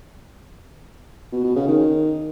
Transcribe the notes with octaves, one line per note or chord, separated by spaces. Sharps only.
B2
B2
C#3
D#3